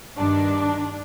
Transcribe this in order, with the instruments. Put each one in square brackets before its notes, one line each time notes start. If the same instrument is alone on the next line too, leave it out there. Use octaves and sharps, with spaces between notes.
[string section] G2 D#3 D4